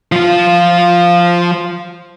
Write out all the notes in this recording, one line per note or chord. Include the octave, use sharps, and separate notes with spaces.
F3 F4